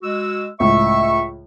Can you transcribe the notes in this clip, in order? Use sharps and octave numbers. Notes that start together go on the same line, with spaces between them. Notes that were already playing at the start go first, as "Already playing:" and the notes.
G#3 F#4 E6
C#2 A2 E5 C#6